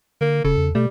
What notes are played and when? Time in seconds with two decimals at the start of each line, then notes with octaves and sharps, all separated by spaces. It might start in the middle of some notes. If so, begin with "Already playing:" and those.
0.21 D3 A#3
0.45 F1 C#3 A4
0.57 E2
0.75 B2 G3 A3